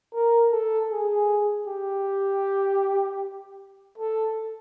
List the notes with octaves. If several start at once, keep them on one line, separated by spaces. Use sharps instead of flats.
A#4
A4
G#4
G4
A4